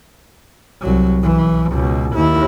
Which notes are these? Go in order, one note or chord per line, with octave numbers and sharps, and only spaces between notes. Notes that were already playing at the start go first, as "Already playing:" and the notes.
C2 F#3
B1 E3
C#2 B2
D#2 E4